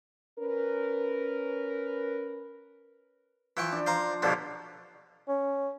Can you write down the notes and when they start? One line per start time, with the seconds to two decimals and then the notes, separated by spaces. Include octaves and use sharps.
0.39 C#4 A#4 B4
3.57 E3 F3 G5 C#6
3.72 D4
3.86 C5 F5 A#5
4.22 B2 D3 F3 G4 C#5 F5
5.28 C#4